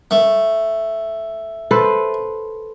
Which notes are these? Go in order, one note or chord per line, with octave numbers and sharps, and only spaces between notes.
A3
A4 B4 C5